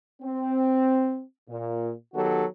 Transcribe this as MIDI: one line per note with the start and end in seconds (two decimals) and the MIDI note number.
0.22 1.21 60
1.48 1.91 46
2.14 2.44 51
2.14 2.44 54
2.14 2.44 59
2.14 2.44 66
2.14 2.44 67
2.14 2.44 69